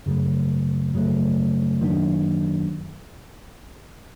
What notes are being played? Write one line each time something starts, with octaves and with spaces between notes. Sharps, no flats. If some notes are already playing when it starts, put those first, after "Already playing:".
F#2 C#3 F#3 A3
F#2 C#3 F#3 A3
F#2 D#3 F#3 A#3 D4